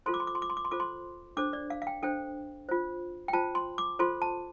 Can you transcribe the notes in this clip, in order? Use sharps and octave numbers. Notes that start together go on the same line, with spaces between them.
F4 A4 C5 C6
D6
C6
D6
C6
D6
C6
D6
C6
F4 A4 C5 D6
C6
D4 A4 C5 D6
D5
F5
F5
G5
D4 A4 C5 G5
F4 C5
G5
F4 C5 A5
C6
D6
F4 A4 C5 C6
A5